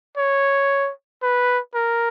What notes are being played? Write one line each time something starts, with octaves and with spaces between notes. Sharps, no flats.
C#5
B4
A#4